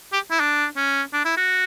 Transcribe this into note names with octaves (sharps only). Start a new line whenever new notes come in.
G4
E4
D4
C#4
D4
E4
F#4